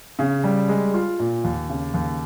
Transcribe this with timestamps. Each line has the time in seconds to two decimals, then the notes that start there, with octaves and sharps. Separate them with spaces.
0.19 C#3
0.44 G3
0.69 G#3
0.94 F4
1.19 A#2
1.44 D#2
1.69 C#3
1.94 D#2